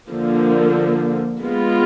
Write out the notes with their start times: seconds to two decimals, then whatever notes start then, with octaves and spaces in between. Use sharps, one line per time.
0.10 D3 F3 A#3
1.42 G#3 B3 F4